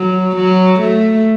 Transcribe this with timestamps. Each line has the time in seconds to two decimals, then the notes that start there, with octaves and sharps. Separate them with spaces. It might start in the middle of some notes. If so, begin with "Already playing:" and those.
Already playing: F#3
0.36 F#3
0.80 A3